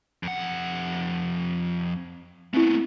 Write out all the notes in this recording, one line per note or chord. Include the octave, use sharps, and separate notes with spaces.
F2 F#5
A3 B3 C4 E4